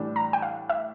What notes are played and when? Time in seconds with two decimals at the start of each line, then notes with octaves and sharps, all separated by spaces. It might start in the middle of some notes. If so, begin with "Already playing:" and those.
Already playing: A2 E3 G3 D4 G4
0.16 A#5
0.33 G5
0.42 F5
0.69 E5